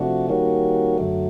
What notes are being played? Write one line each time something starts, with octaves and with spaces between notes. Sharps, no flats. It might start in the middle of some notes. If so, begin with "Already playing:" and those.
Already playing: C3 F3 A3 D4 F#4
D#3 G3 A#3 C#4 F#4
F#2 D3 F#3 A3